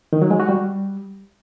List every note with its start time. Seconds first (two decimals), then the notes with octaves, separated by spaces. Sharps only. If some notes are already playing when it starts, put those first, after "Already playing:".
0.13 D#3
0.22 F#3
0.31 G#3
0.40 F#4
0.49 G3